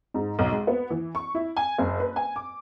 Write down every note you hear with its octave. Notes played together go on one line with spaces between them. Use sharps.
G#2
B1
G#3
B3
E3
C#6
E4
G#5
F#1
B4
G#5
D6